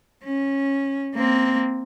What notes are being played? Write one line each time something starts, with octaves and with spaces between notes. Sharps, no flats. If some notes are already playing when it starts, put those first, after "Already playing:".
C#4
A#3 C4